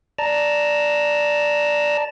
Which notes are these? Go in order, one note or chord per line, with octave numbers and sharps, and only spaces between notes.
D5 A5 A#5